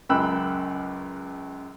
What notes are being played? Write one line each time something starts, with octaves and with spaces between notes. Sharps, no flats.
C#2 F#2 G5 B5 E6 F#6